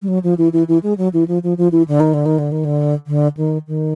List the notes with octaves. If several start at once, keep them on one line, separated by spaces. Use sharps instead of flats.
G3
F#3
F3
E3
E3
E3
G#3
F#3
E3
F3
F3
F3
E3
D3
D#3
D3
D#3
D3
D#3
D3
D3
D#3
D#3